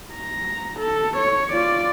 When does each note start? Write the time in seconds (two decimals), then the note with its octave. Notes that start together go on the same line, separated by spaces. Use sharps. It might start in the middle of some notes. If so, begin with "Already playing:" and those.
0.13 A#5
0.80 A4
1.17 C#5
1.53 F4 D5